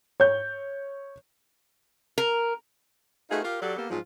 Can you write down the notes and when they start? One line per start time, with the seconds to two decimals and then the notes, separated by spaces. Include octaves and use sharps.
0.20 C#5 G6
2.18 A#4
3.30 A3 D#4 F4 F#4 G#4 B4
3.44 F4 G4 A#4
3.62 F#3 F#4 G4 A4 D5
3.76 A#3 B3 G4 A4
3.90 G#2 F3 F#3 G#3 B3 F4